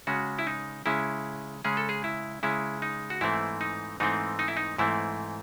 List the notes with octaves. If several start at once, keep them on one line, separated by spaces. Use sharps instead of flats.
C#3 G#3 C#4 F#4
E4
D#4
C#3 G#3 C#4 E4
C#3 G#3 C#4 G#4
A4
G#4
E4
C#3 G#3 C#4 E4
D#4
F#4
G#2 E3 A3 C4 E4
D#4
G#2 E3 A3 C4 D#4
D#4
E4
D#4
G#2 E3 A3 C4 E4